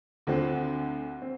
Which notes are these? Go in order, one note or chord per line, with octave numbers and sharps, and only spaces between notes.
D2 D3 F3 C4
C4